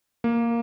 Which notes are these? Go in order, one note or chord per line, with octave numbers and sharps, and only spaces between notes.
A#3